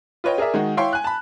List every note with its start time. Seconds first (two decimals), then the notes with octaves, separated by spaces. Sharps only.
0.24 F4 B4 C#5 D#5 G5
0.38 G#4 A#4 D5 E5
0.54 D#3 G#3 F#4
0.77 E4 C#5 F5 G5 C6 C#6
0.93 G#5 F#6
1.04 A5 B5